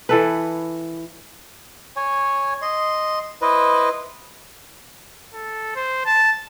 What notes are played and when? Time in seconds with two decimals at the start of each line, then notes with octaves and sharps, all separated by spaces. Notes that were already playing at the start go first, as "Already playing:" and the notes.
0.09 E3 A4 B4
1.96 C#5 G#5
2.62 D#5 C6
3.42 E4 B4 C5 D#5
5.34 A4
5.76 C5
6.06 A5